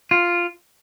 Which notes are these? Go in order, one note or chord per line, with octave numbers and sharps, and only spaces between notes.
F4